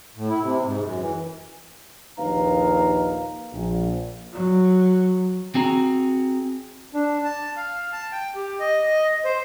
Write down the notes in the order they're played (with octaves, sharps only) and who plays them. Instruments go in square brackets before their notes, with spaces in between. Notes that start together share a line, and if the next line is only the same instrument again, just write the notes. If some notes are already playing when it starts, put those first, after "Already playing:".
[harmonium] A2
E4
C3
G#2
F#2
E3
[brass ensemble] A#1 D#2 D#4 B4 F5 A#5
A#1
[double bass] F#3
[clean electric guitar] C4 F#4 G#4 A#5
[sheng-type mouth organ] D4
A5
F5
A5
G5
G4
D#5
C5